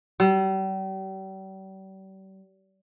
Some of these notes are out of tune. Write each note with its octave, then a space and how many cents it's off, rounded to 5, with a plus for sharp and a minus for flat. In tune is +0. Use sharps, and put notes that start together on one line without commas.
G3 -40